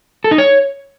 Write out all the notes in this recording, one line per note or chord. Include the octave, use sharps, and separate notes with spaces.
A4
D#4
C#5